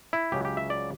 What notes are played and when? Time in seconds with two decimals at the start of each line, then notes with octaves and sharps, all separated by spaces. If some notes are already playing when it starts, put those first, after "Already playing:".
0.13 E4
0.32 C#2 C#3 F#3 G4
0.45 G4
0.57 E5
0.70 D5